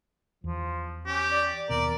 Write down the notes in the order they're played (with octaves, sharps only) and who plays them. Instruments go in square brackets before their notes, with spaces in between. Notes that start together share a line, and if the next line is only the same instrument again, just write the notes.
[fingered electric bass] E2 [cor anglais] F3
[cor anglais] C#4 [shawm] G4
[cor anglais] D5
[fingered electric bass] D#2 B2 [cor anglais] A#4 [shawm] D5